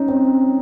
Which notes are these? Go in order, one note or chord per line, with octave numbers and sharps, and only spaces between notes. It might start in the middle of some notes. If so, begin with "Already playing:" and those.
Already playing: C#4 D#4
C4